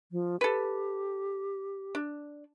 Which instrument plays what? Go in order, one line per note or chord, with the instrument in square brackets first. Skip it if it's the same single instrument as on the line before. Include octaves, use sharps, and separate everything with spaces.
[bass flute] F3
[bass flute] G4 [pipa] A4 B4
[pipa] D4